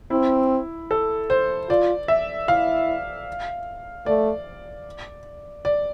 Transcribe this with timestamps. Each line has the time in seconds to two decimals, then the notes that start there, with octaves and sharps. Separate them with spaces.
0.10 C4 E4
0.91 A4
1.30 C5
1.69 F4 D5
2.08 E5
2.48 E4 F5
4.06 A3 D5
5.65 D5